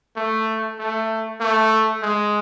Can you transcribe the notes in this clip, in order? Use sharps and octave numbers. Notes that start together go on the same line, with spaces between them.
A3
A3
A3
G#3